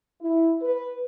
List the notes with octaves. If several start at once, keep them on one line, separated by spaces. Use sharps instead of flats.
E4
B4